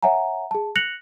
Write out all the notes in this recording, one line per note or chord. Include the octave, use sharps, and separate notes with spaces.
C#5 E5 F#5 G#5 A#5
G#4 A5
F#6 A#6 C#7 F7 F#7